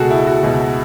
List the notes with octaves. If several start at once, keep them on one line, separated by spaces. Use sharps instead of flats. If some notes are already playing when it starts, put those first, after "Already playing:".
Already playing: C#2 B2 F#4 G#4 A4
E4
F#4
C#2 B2